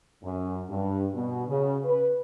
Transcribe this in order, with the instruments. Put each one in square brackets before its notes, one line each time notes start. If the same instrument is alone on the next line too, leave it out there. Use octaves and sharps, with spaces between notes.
[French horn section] F#2
G2
B2
C#3
B4